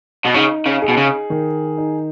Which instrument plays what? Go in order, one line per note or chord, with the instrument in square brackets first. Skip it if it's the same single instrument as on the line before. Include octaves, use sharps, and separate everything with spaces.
[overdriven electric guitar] B2
[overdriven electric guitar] C#3 [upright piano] D#4
[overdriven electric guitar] C#3
[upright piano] G#4
[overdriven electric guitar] B2
C#3
[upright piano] D#3
D#4